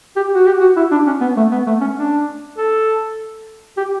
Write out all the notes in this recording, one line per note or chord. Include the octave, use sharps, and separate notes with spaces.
G4
F#4
G4
F#4
E4
D4
C#4
B3
A3
B3
A3
C#4
D4
A4
G4